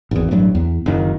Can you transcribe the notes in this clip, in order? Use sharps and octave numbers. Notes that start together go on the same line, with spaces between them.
G#1 E2
A1 G2 F#3
E2
F#1 D#3